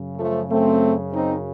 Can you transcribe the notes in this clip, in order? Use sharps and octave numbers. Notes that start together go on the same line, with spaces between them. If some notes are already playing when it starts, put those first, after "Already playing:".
Already playing: F#2 C#3
F3 A3
A3 C4
C4 D#4